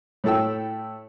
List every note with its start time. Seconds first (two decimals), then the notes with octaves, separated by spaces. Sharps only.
0.24 A2 E4 A4 G5 E6